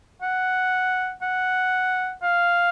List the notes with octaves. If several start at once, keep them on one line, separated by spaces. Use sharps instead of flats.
F#5
F#5
F5